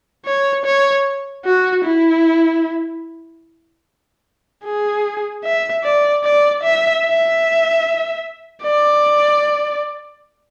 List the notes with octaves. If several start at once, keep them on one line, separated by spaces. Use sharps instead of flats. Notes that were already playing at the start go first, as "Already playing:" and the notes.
C#5
C#5
F#4
E4
G#4
E5
D5
D5
E5
E5
D5